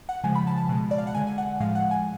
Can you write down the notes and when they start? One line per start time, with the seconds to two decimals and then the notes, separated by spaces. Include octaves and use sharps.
0.09 F#5
0.24 C#3 F3 G#3 G#5
0.35 B5
0.47 A5
0.58 A5
0.69 B2 G#3
0.91 D5
0.98 F5
1.07 F#5
1.14 D3 G#3 G#5
1.27 G#5
1.38 F#5
1.60 A2 F3 G#3 F5
1.75 F#5
1.91 G#5